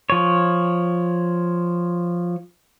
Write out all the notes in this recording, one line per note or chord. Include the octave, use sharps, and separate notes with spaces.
F3 C#5